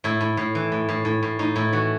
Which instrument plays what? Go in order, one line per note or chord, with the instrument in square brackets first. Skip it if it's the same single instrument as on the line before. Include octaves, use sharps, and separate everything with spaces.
[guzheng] A2 E4
A2
A2
E3
A2
A2
A2
A2
A2 D#4
A2 E4
E3 F#4